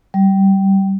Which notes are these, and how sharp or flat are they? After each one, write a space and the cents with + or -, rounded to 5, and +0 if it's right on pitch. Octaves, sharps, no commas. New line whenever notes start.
G3 -15